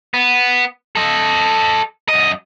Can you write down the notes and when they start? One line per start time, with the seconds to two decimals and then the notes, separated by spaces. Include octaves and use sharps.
0.14 B3
0.96 A4 D#5
2.09 F#2 D#5